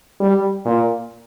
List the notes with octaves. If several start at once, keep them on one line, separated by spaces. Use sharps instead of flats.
G3
A#2